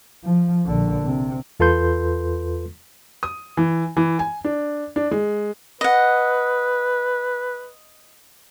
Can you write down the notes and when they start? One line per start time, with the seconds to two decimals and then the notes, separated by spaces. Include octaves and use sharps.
0.25 F3
0.66 A#1 D3
1.06 C3
1.60 E2 F4 A4 B4 C6 G6
3.23 D#6
3.57 E3
3.97 E3
4.19 G#5
4.44 D4
4.96 D4
5.11 G#3
5.81 B4 D#5 F#5